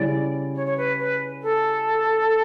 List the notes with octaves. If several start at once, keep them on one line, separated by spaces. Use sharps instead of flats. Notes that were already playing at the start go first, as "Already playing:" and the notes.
Already playing: C#3 G3 C#4 E4 D5
C#5
C#5
B4
B4
A4